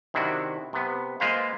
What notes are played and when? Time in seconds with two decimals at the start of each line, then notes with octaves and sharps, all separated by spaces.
0.14 C3 D#3 D4 E4 F#4
0.73 C3 B3
1.20 G#3 A#3 F4 B4 C5 F5